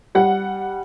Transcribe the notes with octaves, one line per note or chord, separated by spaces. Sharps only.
G3 F#5